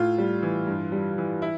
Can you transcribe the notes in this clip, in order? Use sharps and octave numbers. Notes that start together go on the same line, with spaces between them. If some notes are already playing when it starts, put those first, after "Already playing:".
Already playing: A2 F4
G3
E3
G2
G3
E3
E4